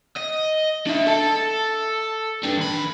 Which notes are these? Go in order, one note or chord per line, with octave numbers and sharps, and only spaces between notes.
D#5
D4 E5
A4 A5
G3 D4
D#3 B5